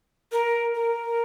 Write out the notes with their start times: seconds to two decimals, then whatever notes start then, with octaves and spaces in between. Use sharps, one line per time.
0.32 A#4
0.75 A#4